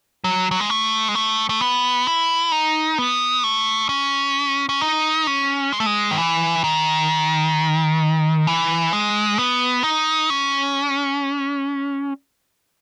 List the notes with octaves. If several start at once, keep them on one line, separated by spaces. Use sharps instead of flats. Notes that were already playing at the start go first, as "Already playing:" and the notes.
F#3
F#3
G#3
A3
G#3
A3
A3
B3
E4
D#4
B3
A3
C#4
C#4
D#4
C#4
G#3
A3
G#3
D#3
E3
D#3
E3
G#3
B3
D#4
C#4